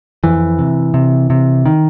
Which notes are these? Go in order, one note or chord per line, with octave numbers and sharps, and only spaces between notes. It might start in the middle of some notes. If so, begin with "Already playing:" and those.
F2 E3
C3
C3
C3
D#3